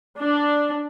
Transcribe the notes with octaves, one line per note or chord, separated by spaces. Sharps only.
D4